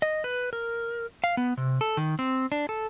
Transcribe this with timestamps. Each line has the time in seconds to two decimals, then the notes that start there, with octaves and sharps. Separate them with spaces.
0.02 D#5
0.24 B4
0.53 A#4
1.24 F5
1.37 B3
1.57 C3
1.81 A4
1.97 D#3
2.19 C4
2.52 D4
2.69 A4